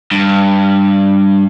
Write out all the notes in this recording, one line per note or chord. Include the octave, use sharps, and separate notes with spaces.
G2